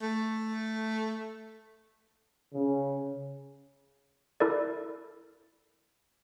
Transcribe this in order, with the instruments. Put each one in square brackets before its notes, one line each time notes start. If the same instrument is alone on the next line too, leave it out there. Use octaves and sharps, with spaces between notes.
[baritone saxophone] A3
[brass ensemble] C#3
[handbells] E4 A4 A#4 D5